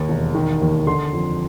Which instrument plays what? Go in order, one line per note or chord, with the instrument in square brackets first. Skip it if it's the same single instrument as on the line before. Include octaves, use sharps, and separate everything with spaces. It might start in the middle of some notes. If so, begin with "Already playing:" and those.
Already playing: [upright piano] D#2
E1
D#3
D#2
D3 C6
F2